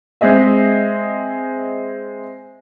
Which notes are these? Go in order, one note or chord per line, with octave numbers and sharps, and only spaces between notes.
G#3 C4 G#4 D#5 E5